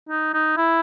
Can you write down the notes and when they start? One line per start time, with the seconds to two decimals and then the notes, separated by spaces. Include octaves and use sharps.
0.09 D#4
0.33 D#4
0.57 E4